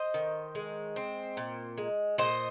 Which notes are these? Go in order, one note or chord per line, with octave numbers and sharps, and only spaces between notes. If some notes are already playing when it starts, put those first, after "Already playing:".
Already playing: C5 D#5
D#3
G#3
C4
A#2
G#3
A#2 C5 D#5